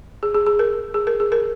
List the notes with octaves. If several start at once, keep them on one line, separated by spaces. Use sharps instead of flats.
G#4
G#4
G#4
A#4
G#4
A#4
G#4
A#4